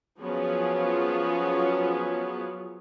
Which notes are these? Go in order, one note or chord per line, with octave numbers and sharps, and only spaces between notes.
F3 F#3 B3 C#4 F4 G#4